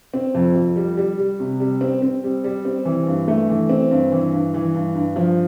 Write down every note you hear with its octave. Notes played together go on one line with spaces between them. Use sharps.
C4
F2
F2
G3
G3
G3
C3
G3
C4
C4
G3
G3
C4
E3
G2
A3
E3
C4
G2
E3
G2
E3
G2
G2
F3